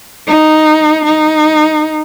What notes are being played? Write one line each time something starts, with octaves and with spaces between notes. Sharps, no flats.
D#4
D#4